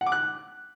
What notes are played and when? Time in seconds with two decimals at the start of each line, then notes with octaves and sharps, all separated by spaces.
0.01 F#5
0.06 D6
0.12 F#6